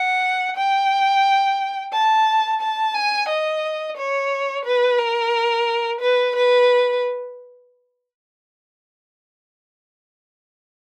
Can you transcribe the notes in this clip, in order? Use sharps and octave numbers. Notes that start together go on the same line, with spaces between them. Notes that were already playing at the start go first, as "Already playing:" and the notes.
Already playing: F#5
G5
A5
A5
G#5
D#5
C#5
B4
A#4
B4
B4